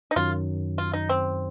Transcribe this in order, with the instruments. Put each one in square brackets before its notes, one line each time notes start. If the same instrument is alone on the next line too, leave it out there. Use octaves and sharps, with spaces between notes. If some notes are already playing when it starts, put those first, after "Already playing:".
[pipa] D#4
[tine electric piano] F#2 D#3 F#3 [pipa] F4
[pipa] F4
D#4
C4